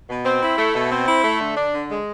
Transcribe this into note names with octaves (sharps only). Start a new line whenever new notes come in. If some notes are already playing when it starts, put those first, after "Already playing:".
B2
C4
E4
A3
B2
C4
E4
A3
D3
D4
D3
G#3